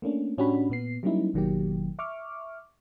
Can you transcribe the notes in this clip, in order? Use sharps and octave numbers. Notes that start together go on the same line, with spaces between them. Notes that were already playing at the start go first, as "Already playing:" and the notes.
A3 A#3 C#4 D4
A2 C#4 D4 F#4 G4 B5
A#2 B3 C7
F#3 G3 A#3 C#4 D#4 E4
G#1 B2 D#3 F#3 A#3 G4
E5 C#6 D6 F6